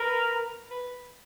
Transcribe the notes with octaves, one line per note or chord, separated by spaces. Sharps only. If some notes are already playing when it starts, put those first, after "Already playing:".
Already playing: A#4 B4
B4